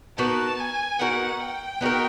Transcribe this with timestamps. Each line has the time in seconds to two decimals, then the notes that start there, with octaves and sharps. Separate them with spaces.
0.18 B3 D#4 F#4 A#4 A5
0.60 G#5
0.99 B3 D#4 F#4 A#4 F#5
1.40 G5
1.81 B3 D#4 F#4 A#4